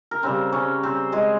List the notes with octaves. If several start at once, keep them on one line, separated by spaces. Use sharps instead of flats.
A#4
C#3 G3 C4 C5
C#4 C#5
C4 C5
G#3 G#4